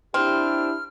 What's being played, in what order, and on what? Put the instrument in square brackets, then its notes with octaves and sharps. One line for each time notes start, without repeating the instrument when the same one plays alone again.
[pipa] C4 [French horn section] D4 E4 G4 [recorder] F6